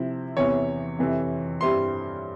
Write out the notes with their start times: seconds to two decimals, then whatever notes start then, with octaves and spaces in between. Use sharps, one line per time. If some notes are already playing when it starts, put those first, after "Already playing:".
Already playing: C3 F3 C4 E4
0.37 E2 C3 E3 C#5
0.99 F2 C3 E3
1.61 G2 G3 C4 E4 C6